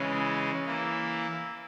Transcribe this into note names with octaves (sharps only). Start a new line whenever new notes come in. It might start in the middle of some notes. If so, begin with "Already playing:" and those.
Already playing: C#3 E3 G#3 C#4
E3 A#3 E4